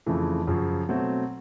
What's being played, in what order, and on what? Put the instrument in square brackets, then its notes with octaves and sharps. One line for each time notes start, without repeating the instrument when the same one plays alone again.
[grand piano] F2 C#3 E3 A3
F#2 C#3 F3
B2 F#3 A3 C4